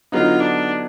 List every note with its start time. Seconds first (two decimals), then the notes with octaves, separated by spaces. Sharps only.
0.12 D3 F#3 B3 D#4 F4
0.40 D4